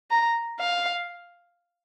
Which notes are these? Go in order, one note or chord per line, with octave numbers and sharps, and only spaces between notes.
A#5
F5